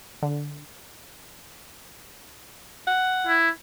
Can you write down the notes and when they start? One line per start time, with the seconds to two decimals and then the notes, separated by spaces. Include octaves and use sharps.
0.23 D3
2.87 F#5
3.27 E4